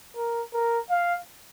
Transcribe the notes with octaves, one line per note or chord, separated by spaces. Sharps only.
A#4
A#4
F5